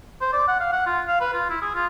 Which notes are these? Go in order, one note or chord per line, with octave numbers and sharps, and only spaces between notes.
C5
D5
F#5
F5
F#5
F4
F5
B4
F4
E4
G#4
F4